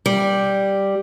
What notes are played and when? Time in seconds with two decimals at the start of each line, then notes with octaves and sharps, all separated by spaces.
0.06 G3